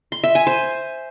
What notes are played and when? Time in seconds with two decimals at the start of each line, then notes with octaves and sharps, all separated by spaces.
0.12 C6
0.24 E5
0.35 G#5
0.47 C5